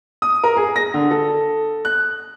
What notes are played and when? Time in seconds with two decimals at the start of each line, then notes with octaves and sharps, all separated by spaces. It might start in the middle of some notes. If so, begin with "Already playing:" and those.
0.22 D#6
0.44 A#4
0.57 G#4
0.76 A#6
0.94 D3
1.11 A4
1.85 F#6